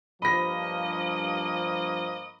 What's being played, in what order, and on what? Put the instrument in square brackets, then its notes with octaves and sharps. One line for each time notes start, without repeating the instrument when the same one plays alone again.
[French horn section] G2 F3 [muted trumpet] A#3 [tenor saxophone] D#5 [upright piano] B5 A#6